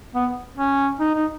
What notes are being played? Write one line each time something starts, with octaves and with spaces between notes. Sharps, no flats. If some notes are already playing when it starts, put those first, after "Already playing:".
B3
C#4
D#4
D#4